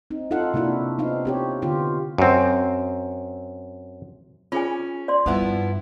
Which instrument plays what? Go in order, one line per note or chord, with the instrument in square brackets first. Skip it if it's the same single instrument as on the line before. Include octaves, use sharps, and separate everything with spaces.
[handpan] C4 D#4
D#4 F4 A4 F5 F#5
C3 A#3 D4 E4 F#4
B3 C4 D#4 F4 F5
C4 G4 C#5
D3 B3 F4 G4
[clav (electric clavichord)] F#2 C4
[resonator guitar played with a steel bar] C#4 [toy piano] F4 G#4 G#5
[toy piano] D5 C6
[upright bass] G2 [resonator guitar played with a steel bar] F3 B3 E4